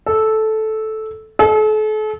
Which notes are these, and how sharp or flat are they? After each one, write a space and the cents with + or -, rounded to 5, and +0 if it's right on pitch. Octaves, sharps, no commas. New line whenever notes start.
A4 -10
A4 -40